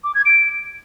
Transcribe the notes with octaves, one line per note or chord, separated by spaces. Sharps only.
D6
G#6
D7